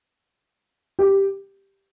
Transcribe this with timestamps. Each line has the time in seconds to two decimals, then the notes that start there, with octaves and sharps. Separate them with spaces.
0.99 G4